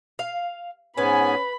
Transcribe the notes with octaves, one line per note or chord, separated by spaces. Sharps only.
F5
G#2 B3 C#4 B4 G#5 B5